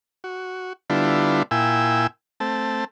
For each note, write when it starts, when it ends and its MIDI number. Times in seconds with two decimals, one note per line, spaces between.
0.24 0.73 66
0.90 1.43 50
0.90 1.43 55
0.90 1.43 59
0.90 1.43 62
0.90 1.43 64
0.90 1.43 65
1.51 2.07 46
1.51 2.07 64
1.51 2.07 79
1.51 2.07 80
1.51 2.07 88
2.40 2.85 57
2.40 2.85 60
2.40 2.85 81